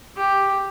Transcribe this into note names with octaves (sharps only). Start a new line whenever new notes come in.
G4